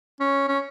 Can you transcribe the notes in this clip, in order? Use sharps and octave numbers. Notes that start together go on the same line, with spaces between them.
C#4
C#4